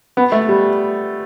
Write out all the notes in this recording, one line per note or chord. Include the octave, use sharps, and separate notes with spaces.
B3
A3
G3